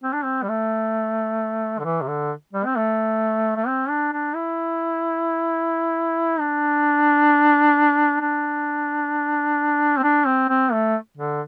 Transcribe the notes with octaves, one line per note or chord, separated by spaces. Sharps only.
C4
D4
C4
G3
A3
D3
E3
C3
D3
G3
C4
A3
A3
C4
D4
D4
E4
D4
D4
C4
D4
C4
C4
A3
D3